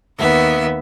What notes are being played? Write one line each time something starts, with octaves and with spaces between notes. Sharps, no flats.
D#2 B3 E5